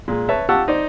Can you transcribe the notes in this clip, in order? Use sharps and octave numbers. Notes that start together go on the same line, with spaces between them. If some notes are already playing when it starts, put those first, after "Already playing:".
A#2 G#3
B4 C#5 E5 A5
F4 G4 F#5 A5 C#6 E6
D#4 C5 D5